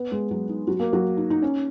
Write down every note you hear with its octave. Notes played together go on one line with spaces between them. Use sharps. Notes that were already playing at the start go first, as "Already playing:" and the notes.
Already playing: B3 B4
G#3 G#4
F#3 F#4
D#4
F#3 F#4
A#3 A#4
F#3 F#4
D#4
D#4
C#4